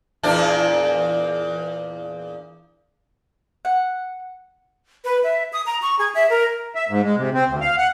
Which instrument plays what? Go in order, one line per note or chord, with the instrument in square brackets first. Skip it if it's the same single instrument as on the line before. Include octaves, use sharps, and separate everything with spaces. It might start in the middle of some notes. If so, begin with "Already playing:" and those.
[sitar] E2 A#2 D4
[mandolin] F#5
[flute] B4
E5
D#6
A#5
C#6
G#4
E5
A#4
[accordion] E5
G#2
G#3
C3
C4
D2
F5
F#5